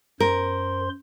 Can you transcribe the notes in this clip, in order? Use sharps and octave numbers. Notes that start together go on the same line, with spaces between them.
F#2 A#4 C5 C6